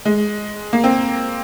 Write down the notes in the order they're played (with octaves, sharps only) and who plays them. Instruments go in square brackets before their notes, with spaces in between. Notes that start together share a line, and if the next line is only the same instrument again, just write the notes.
[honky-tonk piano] G#3
A#3
C4